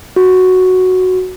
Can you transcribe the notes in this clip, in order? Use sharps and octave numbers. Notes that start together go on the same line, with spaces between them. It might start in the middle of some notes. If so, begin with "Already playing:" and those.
F#4